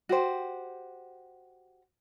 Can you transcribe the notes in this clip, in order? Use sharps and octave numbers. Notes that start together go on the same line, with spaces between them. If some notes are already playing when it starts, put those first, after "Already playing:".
F#4 G4 C5